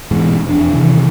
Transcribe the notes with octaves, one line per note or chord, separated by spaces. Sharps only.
G#2 B2 E3 G#3
E1 F2 D4
C3 D#3 E3